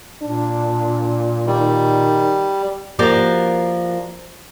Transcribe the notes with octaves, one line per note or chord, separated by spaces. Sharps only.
A#2 D4
D#3 G3
F3 A#3 F#4 G4 A#4 D5